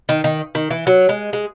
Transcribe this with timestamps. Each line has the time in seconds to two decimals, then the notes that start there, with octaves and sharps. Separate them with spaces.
0.09 D#3
0.24 D#3
0.55 D#3
0.70 E3
0.87 F#3
1.09 G#3
1.33 G#3